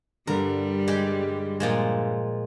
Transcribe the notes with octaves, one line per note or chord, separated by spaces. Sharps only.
G2 D3 G3 A#4
G#3 G4
A#2 F3 G#3